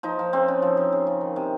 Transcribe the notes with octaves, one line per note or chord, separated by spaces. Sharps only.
F3 D#4
F3
C#3 C4
C#3
F3
F3
C#3
C#3
D#3
C3